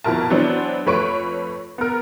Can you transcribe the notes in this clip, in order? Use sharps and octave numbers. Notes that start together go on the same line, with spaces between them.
F2 B2 E4 A#4 A5
E3 F#3 B3 C4 D4
F2 A3 B4 C#5 C#6 D7
B3 A#4